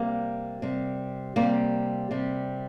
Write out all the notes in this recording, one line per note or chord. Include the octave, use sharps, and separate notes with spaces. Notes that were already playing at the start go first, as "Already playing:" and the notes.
Already playing: C3 G3 A#3
C3 G3
C3 G3 A#3
C3 G3